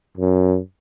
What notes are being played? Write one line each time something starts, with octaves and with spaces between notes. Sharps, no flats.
F#2